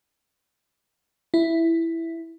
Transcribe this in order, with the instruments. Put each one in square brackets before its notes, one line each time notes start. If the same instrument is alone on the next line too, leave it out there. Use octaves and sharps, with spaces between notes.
[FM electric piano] E4